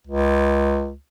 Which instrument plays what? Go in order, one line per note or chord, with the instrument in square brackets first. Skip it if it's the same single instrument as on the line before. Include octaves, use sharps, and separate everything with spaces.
[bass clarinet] C#2